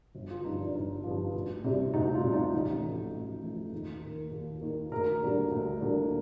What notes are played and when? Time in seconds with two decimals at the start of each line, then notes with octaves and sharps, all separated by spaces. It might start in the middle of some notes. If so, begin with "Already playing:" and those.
0.15 G1
0.30 F4
0.44 G2 F3 D#4
0.60 D4
0.75 G1 D#4
1.04 G2 F3
1.34 D2
1.64 C3 G3
1.94 D2 D#4
2.14 F4
2.24 C3 G3
2.33 D#4
2.53 A1 D#4
2.83 A2 F3
3.13 A1
3.42 A2 F3
3.73 D#2 D#4
4.02 D#3 A#3
4.32 D#2
4.61 D#3 A#3
4.92 D2 A#4
5.21 D3 G3 A#3
5.51 D2
5.81 D3 G3 A#3